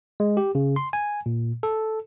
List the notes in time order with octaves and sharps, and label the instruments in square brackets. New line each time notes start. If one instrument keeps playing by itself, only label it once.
[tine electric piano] G#3
G4
C#3
C6
G#5
A#2
A4